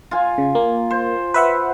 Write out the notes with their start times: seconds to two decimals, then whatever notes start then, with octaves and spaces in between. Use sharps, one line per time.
0.11 F4 G#5
0.38 C#3
0.55 A#3
0.90 C5
1.34 B4 E5 F#5